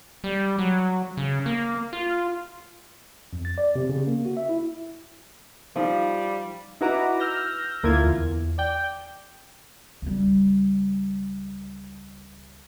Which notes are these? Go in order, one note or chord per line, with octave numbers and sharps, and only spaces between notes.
G3
F#3
C#3
A#3
F4
F2
A6
D5
C3
C#3
A#3
F#4
E5
E4
F3 G3 D#4 F4
D#4 E4 F#4 B4 A#5 D6
E6 F6 G6 A#6
D2 A#3 E4 F4 G#6
E2
D5 G5
C#2 G3